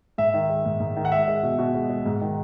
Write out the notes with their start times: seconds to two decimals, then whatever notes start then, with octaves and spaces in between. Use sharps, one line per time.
0.18 G#2 E5
0.34 D#3
0.49 G#3
0.66 G#2
0.80 G#2
0.97 D#3
1.05 F#5
1.12 G#3 E5
1.28 G#3
1.43 B2
1.59 B2
1.74 G#3
1.89 G#3
2.06 G#2
2.21 D#3